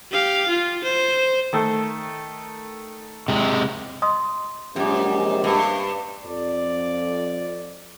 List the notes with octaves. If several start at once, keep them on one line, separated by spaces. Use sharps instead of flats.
G4 F5
F4
C5
D#3 A3 A4
C3 G#3
D#5 C6 D#6
A#1 F#2 C3 G#3 G4 E5 D6
G2
F2 D5